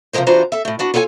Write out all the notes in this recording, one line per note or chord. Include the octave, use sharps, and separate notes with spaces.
C3 F3 F#3 G#3 A#4 C5
E3 D4 F4 F#4 C5 A#5
A4 E5
A2 A3
B3 D4 F#4
F4 A4 C#5 F#5 G#5